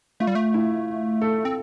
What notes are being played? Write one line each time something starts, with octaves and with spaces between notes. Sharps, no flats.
A3 F4
G3
A3
E4
A4
C4